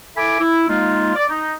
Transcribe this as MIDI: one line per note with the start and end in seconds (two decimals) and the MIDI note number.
0.17 0.38 64
0.17 0.38 69
0.17 0.38 76
0.17 0.38 80
0.17 0.38 83
0.17 0.38 86
0.40 0.65 64
0.68 1.14 56
0.68 1.14 58
0.68 1.14 63
0.68 1.14 65
1.15 1.25 74
1.29 1.53 63